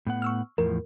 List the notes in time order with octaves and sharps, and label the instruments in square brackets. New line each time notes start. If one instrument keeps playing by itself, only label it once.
[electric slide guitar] A2 B3 F#5
[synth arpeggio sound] C#6 E6 F6
[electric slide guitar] E2 A2 F3 [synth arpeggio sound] A#4